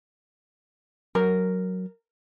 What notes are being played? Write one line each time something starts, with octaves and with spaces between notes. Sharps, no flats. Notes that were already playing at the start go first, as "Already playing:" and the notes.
F#3 A#4